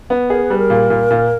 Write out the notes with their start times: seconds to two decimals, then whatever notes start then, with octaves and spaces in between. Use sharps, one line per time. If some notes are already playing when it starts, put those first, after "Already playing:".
0.10 B3
0.30 G#4 A#4
0.44 B4
0.50 G3
0.58 A#4
0.70 A#2
0.90 A#2
1.11 A#2